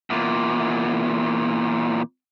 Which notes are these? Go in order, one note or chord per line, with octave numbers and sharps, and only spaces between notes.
E2 A#2